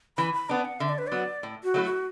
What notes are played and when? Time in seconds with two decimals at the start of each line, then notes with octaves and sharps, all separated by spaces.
0.17 E3 B5
0.34 B5
0.49 B3 D4 A5
0.65 F#5
0.80 D3 E5
0.89 D5
0.98 B4
1.07 F#3 B3 D5
1.43 A2
1.64 F#4
1.74 F#3 A3 E4
1.84 F#4